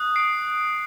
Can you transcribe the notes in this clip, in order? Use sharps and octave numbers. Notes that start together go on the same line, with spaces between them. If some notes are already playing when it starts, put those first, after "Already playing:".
Already playing: D#6 F#6
C7 D7